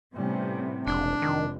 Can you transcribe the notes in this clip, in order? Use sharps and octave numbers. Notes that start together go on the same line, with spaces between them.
A2 C3 G3 B3 C#4
F1 B1 E3 G#3 D4
F1 D#3